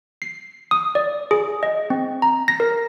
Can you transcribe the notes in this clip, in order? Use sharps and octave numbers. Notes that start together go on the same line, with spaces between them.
C7
D#6
D5
G#4
D#5
C4
A#5
A#6
A#4